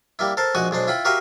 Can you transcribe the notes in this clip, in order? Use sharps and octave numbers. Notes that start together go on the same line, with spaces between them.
G3 A#3 E4
A4 A#4 C5 A5
A#1 G#3 F#4 F#5 G#5
B1 G#3 D4 C5
E4 F4 G5 B5
F#4 G4 A#4 B4 E5 F5